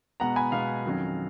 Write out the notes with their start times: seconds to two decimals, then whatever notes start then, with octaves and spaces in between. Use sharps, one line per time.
0.20 B2 G#3 B3 F#5 A#5
0.36 G#5 B5
0.52 B2 G#3 B3 F5
0.85 F2 D#3 F#3 C#4